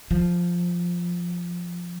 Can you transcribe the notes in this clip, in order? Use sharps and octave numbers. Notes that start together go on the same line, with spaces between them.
F3